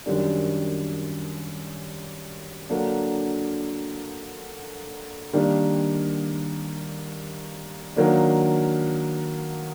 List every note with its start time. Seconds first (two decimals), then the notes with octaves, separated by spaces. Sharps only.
0.06 F#2 D#3 G3 D4
2.70 D3 F#3 A#3 D4
5.33 D#3 G3 A#3 D4
7.96 D#3 F#3 A#3 D4